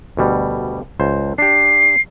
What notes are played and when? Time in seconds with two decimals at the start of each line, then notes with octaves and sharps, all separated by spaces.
0.17 D2 B2 G3
1.00 C#2 C5
1.38 D4 G4 C7